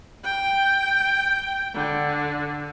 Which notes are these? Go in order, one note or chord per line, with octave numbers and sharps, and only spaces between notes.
G5
D3